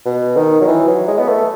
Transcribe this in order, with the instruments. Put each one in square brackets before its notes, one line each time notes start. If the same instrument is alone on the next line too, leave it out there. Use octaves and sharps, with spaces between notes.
[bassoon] B2
D#3
F#3
E3
F#3
G#3
B3
A3